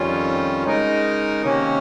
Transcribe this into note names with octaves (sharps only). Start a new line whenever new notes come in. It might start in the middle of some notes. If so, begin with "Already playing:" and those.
Already playing: F2 D#3 G3 C#4 F4
C#3 G#3 D#4 A#4
C3 D#3 A#3 C#4